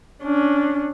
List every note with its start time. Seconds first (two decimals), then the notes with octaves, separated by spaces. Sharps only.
0.24 C#4 D4